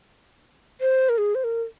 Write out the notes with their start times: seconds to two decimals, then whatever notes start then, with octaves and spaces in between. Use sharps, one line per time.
0.81 C5
1.09 A#4
1.18 G#4
1.35 C5
1.44 A#4